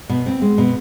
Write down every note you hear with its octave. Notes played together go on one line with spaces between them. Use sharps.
B2
C4
G#3
B2